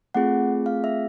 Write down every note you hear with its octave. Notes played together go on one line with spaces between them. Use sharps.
A3 C4 F4 G#4 F#5
F5
E5